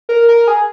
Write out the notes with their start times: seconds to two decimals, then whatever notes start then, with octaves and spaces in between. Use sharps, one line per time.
0.09 A#4
0.28 A#4
0.47 G#4